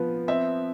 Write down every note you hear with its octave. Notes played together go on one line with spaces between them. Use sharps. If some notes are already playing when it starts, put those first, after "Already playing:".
Already playing: F3 B3
C4 E5